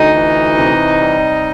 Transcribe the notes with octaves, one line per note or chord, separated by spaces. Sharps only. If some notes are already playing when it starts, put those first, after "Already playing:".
Already playing: D2 D#4 D#5
E3
C3
G3